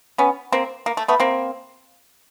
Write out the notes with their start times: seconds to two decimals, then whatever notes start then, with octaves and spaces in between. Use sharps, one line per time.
0.18 B3 C#4
0.52 A#3 C4
0.86 A#3
0.97 A3
1.08 A3 B3
1.20 A#3 C4